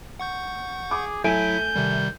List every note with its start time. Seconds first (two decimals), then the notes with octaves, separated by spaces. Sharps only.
0.19 F#5 C#6 G6
0.91 G#4 D6
1.24 F#3 A3 E4 G#5 G6 B6 D7
1.76 C3 D#3 G3